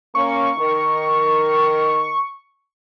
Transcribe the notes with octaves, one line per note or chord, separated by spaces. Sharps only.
A#3 C#4 C#6
D#3 A#4